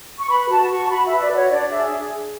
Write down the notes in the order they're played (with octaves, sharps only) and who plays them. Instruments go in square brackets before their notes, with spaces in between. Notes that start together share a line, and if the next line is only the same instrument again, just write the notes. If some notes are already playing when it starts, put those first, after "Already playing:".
[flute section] C#6
B4 B5
F#4 A5
F#4 C#6
A5
F#4 B5
B4 E5
D5
F#4 C#5
D4 D5
G#4 E5